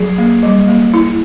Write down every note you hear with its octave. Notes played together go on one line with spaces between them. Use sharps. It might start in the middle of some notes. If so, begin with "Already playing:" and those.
Already playing: F#3 G#4
A#3
G3
A#3
E4